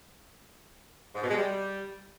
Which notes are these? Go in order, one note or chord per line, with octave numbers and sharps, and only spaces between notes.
G#2
B2
G#3
G3